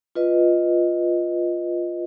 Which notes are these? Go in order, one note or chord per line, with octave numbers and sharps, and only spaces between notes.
F4 B4 D#5